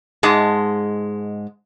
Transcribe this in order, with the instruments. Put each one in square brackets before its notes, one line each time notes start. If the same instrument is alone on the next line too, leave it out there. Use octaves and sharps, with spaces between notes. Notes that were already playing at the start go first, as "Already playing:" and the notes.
[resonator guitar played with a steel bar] G#2 G#3 A5